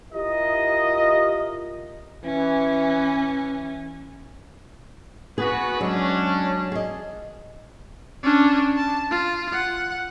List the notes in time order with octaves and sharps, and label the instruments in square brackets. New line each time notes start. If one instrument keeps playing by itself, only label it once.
[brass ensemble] E4 F4 G4 A#4 D#5
[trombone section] E3 [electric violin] C#4
[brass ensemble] B3 F#4 B4 [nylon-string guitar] G#4
[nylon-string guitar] F#3 G#3 [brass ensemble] C#4 D4
[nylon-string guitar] G#4 D#5
[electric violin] C#4 D4
A5
F4
F#5